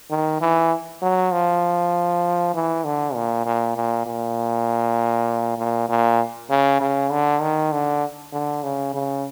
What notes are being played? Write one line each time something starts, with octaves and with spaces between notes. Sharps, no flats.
D#3
E3
F#3
F3
E3
D3
A#2
A#2
A#2
A#2
A#2
A#2
C#3
C#3
D3
D#3
D3
D3
C#3
C#3